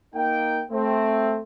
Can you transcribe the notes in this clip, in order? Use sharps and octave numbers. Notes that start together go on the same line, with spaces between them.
A#3 D#4 G5
A3 C4